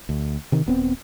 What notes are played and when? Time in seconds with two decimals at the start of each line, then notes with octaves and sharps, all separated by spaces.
0.09 D2
0.52 C3 D#3
0.66 D#1 B3 C4